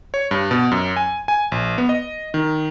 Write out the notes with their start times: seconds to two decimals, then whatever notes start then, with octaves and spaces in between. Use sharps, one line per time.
0.14 C#5
0.31 G2
0.51 B2
0.71 F#2
0.96 G#5
1.28 G#5
1.52 A#1
1.78 B3
1.89 D#5
2.34 D#3